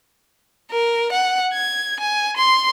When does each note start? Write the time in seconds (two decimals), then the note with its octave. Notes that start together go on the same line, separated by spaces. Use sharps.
0.71 A#4
1.13 F#5
1.54 G#6
2.00 G#5
2.37 C6